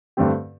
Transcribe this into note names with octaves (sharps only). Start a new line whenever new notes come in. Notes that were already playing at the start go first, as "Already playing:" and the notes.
G2 D3 A3 C4 G4